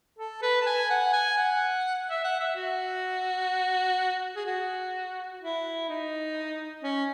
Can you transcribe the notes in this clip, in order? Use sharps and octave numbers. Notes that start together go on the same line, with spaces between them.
A4
B4
A5
G#5
F#5
G#5
F#5
E5
F#5
E5
F#4
G#4
F#4
E4
D#4
C#4